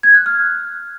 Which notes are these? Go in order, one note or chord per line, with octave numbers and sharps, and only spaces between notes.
G#6
F#6
F6